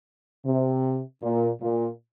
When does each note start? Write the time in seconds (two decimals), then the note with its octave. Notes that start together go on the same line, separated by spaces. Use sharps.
0.46 C3
1.22 A#2
1.62 A#2